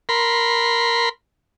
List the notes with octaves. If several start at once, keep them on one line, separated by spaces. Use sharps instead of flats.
A#4 B5 C6